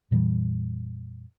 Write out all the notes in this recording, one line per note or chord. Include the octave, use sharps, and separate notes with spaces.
F2 A#2 E3 G3